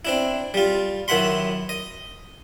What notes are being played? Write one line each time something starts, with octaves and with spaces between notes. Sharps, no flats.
C4 D4 E4
G3 F4
F#2 D#3 E4 F#5 B5 C6
D#5